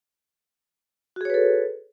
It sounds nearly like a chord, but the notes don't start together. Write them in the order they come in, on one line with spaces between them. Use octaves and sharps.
F#4 G#4 C#5 B4 A4